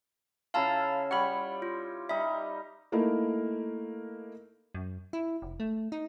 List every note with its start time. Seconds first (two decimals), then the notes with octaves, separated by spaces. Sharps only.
0.54 C#3 E4 F4 F5 A5 A#5
1.11 G3 C#5 F#5 B5
1.62 F4
2.09 G3 D#4 E5
2.92 A3 A#3 D#4 E4 A#4
4.75 F#2
5.13 E4
5.42 F1
5.60 A3
5.92 D#4